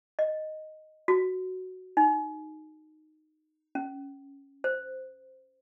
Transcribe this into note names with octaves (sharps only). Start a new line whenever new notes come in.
D#5
F#4
D#4
C#4
C5